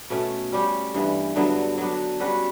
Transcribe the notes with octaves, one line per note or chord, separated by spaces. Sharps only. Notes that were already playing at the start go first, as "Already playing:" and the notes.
B2 A3 C#4
G3 C#4 G4
G2 E3 B3
G2 D3 F#3 B3
F#3 B3 D4
G3 C#4 F#4 B4